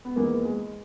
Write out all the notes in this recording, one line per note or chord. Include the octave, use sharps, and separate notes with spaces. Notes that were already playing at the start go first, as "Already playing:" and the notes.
B3
E2 D#3 A#3
G#3